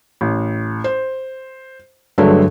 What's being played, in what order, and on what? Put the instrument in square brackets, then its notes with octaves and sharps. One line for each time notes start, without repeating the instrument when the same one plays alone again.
[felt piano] A1
C5
[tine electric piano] G2 F#3 [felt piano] D3 G#3 A3